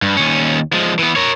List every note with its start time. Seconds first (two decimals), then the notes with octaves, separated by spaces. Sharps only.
0.02 G2
0.17 D#2 C#4
0.73 F3 G#3
0.99 E3 B3
1.16 A#4 C#5